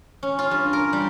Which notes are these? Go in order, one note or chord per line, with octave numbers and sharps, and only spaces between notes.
C#4
F4
G2
A#4
G3